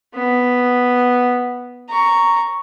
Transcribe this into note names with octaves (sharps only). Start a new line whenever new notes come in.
B3
A#5 C#6